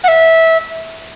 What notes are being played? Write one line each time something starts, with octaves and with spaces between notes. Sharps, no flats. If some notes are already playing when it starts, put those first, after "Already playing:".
F#5
E5